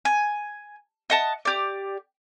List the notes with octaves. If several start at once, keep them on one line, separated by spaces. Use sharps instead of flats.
G#5
D#5 F#5 A5
G4 D5